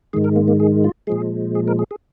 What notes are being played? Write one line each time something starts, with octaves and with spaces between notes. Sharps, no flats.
G#2 D#3 G#3 G#4
A#4
A#3
A#3
G#4
F4
A#2 F3 G#3 G#4
G#4
A#4
G#4
G#4